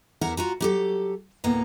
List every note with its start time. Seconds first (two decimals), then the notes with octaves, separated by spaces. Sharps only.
0.21 E2 E4 A#4 E5 F#5 A#5
0.37 F4 F#4 A#5
0.61 F#3 G4 A4
1.44 D2 A2 A#3 B3 A#5